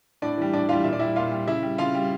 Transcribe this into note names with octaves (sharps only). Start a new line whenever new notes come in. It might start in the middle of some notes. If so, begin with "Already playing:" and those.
A2 D4 D5
E3 G3
A2 D4 D5
E3 G3 F4 F5
A#2 E5
D5
G3 E4 E5
A#2 F4 F5
G3
C#3 E4 E5
G3
C#3 F4 F5
G3